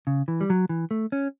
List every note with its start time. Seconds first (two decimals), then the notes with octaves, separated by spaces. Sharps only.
0.07 C#3
0.28 E3
0.41 G3
0.50 F#3
0.69 E3
0.91 A3
1.12 C#4